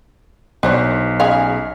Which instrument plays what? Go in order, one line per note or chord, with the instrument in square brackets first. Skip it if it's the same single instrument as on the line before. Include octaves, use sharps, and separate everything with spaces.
[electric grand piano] B1 [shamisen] D4 C5 C#5
[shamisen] C#3 G#4 F5